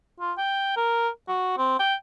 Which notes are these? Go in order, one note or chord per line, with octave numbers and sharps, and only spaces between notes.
F4
G5
A#4
F#4
C4
G5